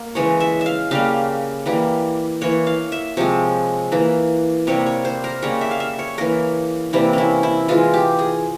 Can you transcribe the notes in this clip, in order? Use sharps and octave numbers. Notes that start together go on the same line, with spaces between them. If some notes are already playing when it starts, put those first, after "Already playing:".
Already playing: A#3
C#3 E3 G#3 C#5
E5
E5
F5
C#3 G3 A#3 F5
E3 G3 A#3
E3 A#3 C#5
F5
E5
C3 F3 G#3 C#5
E3 A#3
C3 G3 A#3 C#5
C#5
C5
A#4
C#3 G3 A#3 C#5
E5
F5
E5
C#5
E3 A#3 A#4
C3 E3 G3 A#3 E4
C#4 E4
E4
E3 G#3 F4
G4
G#4